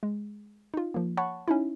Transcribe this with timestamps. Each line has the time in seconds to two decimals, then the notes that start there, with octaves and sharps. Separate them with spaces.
0.03 G#3
0.74 D#4 F4
0.94 F3 A#3
1.17 C#5 F#5 A5 B5 C#6
1.48 C#4 D#4 E4